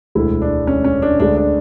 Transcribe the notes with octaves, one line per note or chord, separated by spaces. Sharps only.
E1 D2 D3 G#3 E4
D4
C#4
C#4
D4
D2 D3 G#3 D4
D4